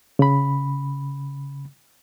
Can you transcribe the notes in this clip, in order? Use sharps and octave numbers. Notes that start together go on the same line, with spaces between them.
C#3 B5